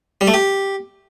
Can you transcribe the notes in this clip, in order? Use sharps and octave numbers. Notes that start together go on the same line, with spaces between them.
G3
A3
G4